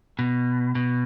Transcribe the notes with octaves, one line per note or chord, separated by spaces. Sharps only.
B2
B2